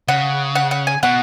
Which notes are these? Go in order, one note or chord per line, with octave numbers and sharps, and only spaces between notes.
C#3 F#5
F#5
F#5
G#5
B2 F#5